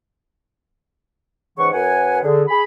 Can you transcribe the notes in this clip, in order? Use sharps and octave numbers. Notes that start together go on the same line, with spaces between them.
G#2 C#3 E3 F#5 C#6
F#2 B4 F#5 G#5
D3 G#4
G#4 B5